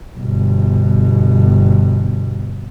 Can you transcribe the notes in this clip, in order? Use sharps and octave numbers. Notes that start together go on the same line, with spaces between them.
G1 B2